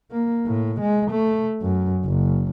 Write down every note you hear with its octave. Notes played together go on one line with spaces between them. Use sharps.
A#3
A2
G#3
A3
F#2
F#1